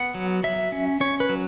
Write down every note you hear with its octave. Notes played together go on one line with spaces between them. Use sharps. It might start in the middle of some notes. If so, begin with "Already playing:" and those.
Already playing: B3 F#5
F#3
F#3 E5
C#4
C#4 C#5
B4
F#3